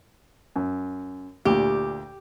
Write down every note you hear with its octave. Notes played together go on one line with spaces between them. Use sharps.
F#2
D2 A#2 G4